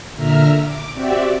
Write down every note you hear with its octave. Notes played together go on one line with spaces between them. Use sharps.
A#2 D3 E5 A#5 F6
D6
C4 F#4 G4 D5 E5